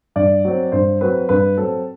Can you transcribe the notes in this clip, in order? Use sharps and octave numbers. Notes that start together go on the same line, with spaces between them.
G2 D5
F#3 C4
G2 C5
F#3 C4 B4
G2 B4
F#3 C4 A4